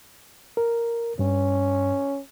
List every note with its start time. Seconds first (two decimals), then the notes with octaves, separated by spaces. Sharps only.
0.57 A#4
1.19 G2 C#4